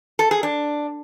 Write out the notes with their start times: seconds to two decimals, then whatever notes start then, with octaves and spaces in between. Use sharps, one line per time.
0.19 A4
0.31 G#4
0.43 D4